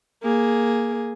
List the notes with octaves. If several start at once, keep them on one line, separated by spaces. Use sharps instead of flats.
A#3 G#4